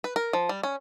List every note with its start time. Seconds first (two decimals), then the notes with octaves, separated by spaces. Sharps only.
0.04 B4
0.16 A#4
0.33 F3
0.49 G3
0.63 C#4